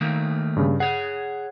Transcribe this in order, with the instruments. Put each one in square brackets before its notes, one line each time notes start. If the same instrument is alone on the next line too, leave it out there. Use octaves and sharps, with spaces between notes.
[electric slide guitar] D#3 A3 A#3
[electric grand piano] G2 C#3
[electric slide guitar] G#4 C#5 [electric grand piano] F#5